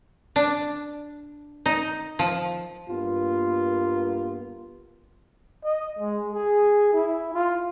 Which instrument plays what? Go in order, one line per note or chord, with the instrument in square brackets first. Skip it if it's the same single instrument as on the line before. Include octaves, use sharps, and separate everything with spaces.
[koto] D4
D#4
F3
[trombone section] G2 G3 A#3 B3 F4
[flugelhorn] D#5
G#3
G#4
E4
F4